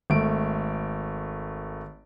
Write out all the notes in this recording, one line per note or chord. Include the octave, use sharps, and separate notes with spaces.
G#1 A3 D7